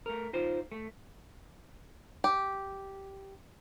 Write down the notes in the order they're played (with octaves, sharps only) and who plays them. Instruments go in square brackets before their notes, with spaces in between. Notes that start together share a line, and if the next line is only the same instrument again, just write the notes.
[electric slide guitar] A3 A#4
D#4 F4 C5
A3
[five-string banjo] G4